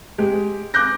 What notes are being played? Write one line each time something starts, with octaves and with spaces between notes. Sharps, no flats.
G#3 G4
D6 F#6 G6 A#6